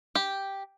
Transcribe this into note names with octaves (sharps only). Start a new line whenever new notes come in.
G4